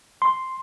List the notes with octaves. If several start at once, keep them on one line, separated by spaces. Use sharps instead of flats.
C6